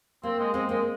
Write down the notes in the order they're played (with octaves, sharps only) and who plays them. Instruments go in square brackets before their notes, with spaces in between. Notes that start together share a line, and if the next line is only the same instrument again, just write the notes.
[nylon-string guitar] A#3 [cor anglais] C4
[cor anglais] G#3
[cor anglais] G#3 [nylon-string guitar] C4
[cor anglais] G#3 [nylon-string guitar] A#3